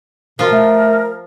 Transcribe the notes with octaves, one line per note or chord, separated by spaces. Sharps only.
B2 F3 F4 A#4
A3